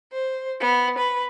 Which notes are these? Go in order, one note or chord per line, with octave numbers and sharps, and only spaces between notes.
C5
B3
B4